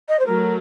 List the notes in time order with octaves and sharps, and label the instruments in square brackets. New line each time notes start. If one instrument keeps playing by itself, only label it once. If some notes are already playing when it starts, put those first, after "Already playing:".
[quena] D#5
C5
[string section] F#3 A3 [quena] A#4